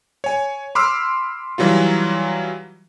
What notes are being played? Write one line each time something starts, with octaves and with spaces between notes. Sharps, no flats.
C#5 G#5
B5 C6 D6 E6 F6
E3 F#3 G3 F4